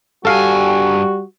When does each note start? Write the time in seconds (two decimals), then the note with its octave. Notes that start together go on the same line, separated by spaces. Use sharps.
0.25 G2 G3 F#4 A4 F5 G#5